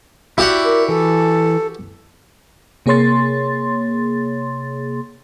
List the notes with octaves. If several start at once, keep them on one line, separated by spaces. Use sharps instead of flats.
E4 F#4 G4 D5 F#5
A#4
E3 A4
C3 A#3 G#4 C#5 C6 A6